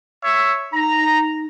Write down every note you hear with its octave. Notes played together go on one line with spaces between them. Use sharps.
C#5 E5
D#4 A#5